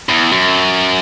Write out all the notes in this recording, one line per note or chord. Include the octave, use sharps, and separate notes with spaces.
E2
F#2